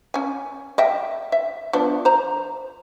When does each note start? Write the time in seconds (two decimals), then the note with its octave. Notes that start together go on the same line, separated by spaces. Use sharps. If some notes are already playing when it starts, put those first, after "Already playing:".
0.14 C#4 G#5
0.78 D#5 E5 G5
1.32 E5
1.73 F3 B3 D4
2.05 C5 A#5